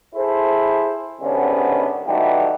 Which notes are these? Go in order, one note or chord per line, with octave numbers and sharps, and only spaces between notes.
E4 G#4 A4 C5
C2 G#2 D3 B3 C#4
E3 G3 A3 D#4 F#4 G4